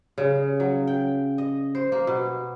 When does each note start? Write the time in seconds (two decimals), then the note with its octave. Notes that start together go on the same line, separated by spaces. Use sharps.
0.18 C#3
0.60 F#3
0.87 G5
1.38 D#5
1.75 C5
1.92 A#3
2.07 B2